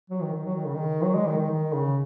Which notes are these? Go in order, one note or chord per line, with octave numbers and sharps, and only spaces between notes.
F#3
D#3
D#3
F#3
D#3
C#3
D#3
F#3
G#3
D#3
D#3
D#3
C#3